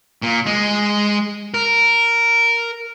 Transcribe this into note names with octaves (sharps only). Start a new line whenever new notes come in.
A#2
G#3
A#4